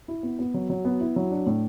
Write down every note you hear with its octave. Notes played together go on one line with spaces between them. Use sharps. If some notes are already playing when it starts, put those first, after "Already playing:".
E4
B3
B3
F#3
F#3
B3
E4
F#3
D4
A2